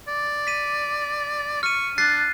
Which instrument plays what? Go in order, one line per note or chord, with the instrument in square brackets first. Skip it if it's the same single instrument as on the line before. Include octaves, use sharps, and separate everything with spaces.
[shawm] D5
[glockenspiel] B6 D#7
[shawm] C#6 [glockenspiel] F6 D#7
[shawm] D4 [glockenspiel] F#6 A6 C7